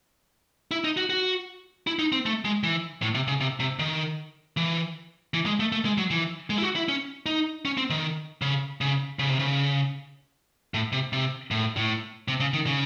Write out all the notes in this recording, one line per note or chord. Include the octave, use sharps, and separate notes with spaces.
E4
D#4
F#4
F#4
E4
D#4
C4
A3
G#3
E3
A2
C3
C#3
C3
C3
D#3
E3
E3
G#3
A3
A3
G#3
F#3
E3
G#3
E4
F#4
E4
C#4
D#4
C#4
C4
D#3
C#3
C#3
C#3
C3
C#3
A2
C3
C3
A2
A2
C3
C#3
D#3
C#3